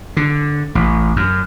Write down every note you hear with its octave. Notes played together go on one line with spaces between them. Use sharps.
D3
A1
F#2